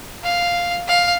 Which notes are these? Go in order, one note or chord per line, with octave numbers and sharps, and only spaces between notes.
F5
F5